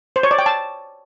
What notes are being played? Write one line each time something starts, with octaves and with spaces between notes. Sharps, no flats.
C5
C#5
D5
G5
A5